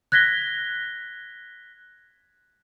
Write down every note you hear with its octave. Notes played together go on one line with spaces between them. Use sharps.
F#6 G#6 A#6 B6 G7